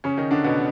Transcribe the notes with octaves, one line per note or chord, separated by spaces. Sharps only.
C#3 C#4
D#3 D#4
D3 D4
B2 B3